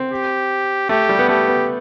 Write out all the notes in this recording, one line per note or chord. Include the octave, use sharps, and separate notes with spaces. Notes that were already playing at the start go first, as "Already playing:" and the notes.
Already playing: C4
G4
A3 G4
G3
B3
A3 G4
B3